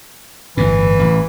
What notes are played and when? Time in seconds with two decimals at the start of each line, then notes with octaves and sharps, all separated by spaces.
0.57 G1 A2 E3
0.99 A1